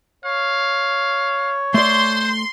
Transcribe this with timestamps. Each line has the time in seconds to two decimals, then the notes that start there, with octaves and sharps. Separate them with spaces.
0.25 C#5 F5
1.74 A3 C5 D5 C6